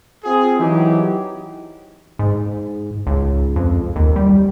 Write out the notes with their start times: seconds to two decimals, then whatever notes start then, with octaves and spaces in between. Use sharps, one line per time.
0.24 C4 F4 G#4
0.59 E3 F#3 D#4 G4
2.19 G#2
3.07 C#2
3.56 F2
3.96 D#2
4.16 G3